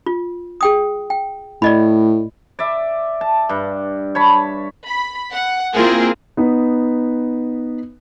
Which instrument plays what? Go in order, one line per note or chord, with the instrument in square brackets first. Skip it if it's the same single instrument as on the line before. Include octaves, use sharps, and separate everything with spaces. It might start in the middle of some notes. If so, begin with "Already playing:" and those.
[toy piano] F4
G#4 G5 D#6
G5
[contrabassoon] A2 [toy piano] D5 D#5 B5
[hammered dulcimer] D5 E5
A5
G2
C#5 A5 B5
[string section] B5
F#5
A#3 C4 E4 F4 G#4 A#4
[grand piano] B3 D#4 B4